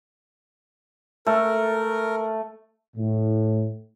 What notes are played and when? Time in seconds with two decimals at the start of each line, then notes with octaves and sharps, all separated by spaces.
1.26 A3 A#4
2.97 A2